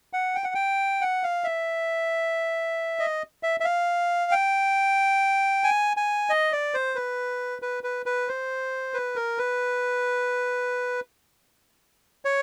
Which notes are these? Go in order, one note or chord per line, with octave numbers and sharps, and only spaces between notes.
F#5
G5
F#5
G5
F#5
F5
E5
D#5
E5
E5
F5
G5
G#5
G#5
D#5
D5
C5
B4
B4
B4
B4
C5
B4
A#4
B4
C#5